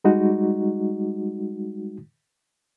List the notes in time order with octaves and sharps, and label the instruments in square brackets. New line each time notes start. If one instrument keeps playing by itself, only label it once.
[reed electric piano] G3 G#3 D#4 F#4